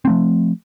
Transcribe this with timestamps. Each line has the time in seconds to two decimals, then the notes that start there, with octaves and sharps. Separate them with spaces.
0.05 C4
0.07 A3
0.10 F3